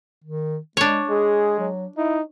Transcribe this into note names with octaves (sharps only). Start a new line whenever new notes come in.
D#3
G#3 D4 C#5
G#3 G#4
F#3
D#4 E4